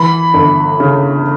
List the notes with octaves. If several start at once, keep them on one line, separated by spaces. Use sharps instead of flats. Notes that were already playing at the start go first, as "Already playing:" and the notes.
Already playing: E3 B5
G1
C#3